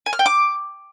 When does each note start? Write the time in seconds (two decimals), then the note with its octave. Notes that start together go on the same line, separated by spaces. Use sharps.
0.06 G#5
0.13 F6
0.19 G5
0.26 D6